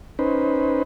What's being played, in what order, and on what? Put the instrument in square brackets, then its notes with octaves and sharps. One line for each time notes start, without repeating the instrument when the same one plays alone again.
[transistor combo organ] C#4 D#4 B4 C5